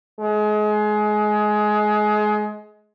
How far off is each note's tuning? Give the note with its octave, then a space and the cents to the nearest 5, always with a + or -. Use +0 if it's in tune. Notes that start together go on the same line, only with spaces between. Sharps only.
G#3 +25